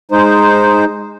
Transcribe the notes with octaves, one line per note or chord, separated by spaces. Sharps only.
G#3 D#4 C5